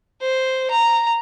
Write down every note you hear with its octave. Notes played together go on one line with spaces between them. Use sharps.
C5
A#5